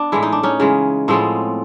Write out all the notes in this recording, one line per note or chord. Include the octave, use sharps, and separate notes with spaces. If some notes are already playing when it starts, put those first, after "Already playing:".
Already playing: B3 D4
A2 E3 G#3 E4
D#4
D4
C#4 D#4
C#3 E3 G#3
A2 F3 G#3 B3 C4